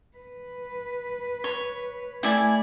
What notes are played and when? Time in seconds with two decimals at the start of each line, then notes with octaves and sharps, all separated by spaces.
0.17 B4
1.44 C#5
2.23 A3 E4 D5 G#5